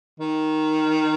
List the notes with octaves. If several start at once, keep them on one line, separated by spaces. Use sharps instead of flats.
D#3